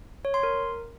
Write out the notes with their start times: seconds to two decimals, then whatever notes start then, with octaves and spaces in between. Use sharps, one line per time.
0.25 C#5
0.34 C6
0.43 A#4